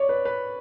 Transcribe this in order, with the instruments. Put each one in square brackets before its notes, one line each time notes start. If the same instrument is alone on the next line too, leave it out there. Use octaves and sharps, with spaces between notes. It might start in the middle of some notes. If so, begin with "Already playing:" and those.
Already playing: [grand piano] C#5 D5
B4
B4